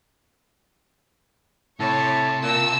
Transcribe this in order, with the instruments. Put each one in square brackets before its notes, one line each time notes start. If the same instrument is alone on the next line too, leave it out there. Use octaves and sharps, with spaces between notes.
[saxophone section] A2 [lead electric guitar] C3 [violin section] C#5 [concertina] A5
[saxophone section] A#2 [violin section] A5 E6